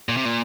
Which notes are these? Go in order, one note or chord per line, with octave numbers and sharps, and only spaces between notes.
A#2
C3
A#2